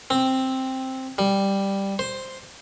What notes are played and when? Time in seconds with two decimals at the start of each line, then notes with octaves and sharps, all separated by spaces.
0.10 C4
1.18 G3
1.99 C5